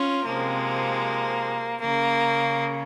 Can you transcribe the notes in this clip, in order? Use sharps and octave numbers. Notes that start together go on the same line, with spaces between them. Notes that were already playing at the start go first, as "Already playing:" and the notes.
Already playing: C#4 F4
C3 F3 G#3 A#3
C#3 A#3